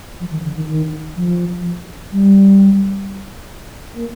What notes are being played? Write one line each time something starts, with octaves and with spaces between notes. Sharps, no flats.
F3
D#3
D3
D#3
D#3
F3
G3
A#3